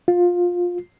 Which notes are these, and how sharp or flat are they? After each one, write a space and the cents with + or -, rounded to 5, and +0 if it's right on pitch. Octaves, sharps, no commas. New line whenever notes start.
F4 +15